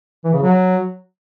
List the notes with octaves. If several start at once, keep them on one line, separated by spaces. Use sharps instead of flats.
E3
C#3
F#3